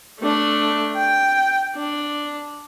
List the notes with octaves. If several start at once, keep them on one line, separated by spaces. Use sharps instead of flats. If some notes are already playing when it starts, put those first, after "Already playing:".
A3 D4
G5
D4